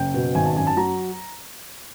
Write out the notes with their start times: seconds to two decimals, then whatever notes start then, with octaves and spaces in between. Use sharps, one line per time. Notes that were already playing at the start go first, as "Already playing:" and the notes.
Already playing: F#1 G5
0.14 B2
0.35 G#1 G#5
0.46 A5
0.56 F#2 G#5
0.67 A5
0.77 F#3 A#5